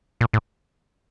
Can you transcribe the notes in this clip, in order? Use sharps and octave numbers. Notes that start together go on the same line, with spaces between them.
A#2
A2